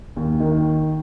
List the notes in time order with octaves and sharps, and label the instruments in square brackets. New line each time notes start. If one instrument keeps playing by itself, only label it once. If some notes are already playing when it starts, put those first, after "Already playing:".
[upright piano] D#2
D#3